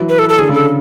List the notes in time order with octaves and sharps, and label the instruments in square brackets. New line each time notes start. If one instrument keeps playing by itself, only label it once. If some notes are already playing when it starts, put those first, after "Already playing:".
Already playing: [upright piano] E3 F#3
[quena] B4
A4
A4
[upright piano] D3 [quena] G#4
[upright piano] C#3 [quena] A4